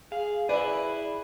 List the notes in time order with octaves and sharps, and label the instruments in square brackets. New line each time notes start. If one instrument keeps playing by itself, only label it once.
[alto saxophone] G#4 [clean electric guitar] F5
[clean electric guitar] E4 G#4 [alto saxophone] B4 [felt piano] D5